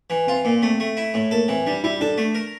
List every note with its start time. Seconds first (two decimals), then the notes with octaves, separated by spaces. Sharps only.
0.10 E3
0.27 C4 F4
0.45 A#2 A#3
0.62 A3 C4
0.80 A3
0.97 E4
1.14 A2
1.31 A#3 A4
1.48 E3 C4
1.66 G3 D4
1.84 G3 E4
2.01 D4 A4
2.18 A3
2.35 A#4